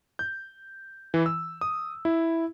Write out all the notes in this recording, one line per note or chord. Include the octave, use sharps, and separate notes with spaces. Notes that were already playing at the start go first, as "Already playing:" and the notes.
G6
E3
E6
D#6
E4